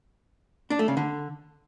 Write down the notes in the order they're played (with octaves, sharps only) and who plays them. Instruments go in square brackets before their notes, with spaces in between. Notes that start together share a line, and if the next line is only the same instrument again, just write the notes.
[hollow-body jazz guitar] D4
A3
C#3
D3